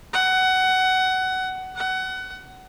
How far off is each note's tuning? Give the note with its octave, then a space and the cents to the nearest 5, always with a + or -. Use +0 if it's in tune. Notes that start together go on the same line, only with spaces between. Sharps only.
F#5 +20
F#5 +25